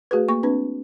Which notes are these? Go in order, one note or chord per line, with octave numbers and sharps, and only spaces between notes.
A3 F#4 G#4 B4
A#3 C#6
C4 D4 B4